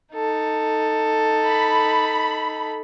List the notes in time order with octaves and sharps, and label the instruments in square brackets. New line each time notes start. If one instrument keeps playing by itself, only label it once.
[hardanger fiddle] D#4 A4
[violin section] B5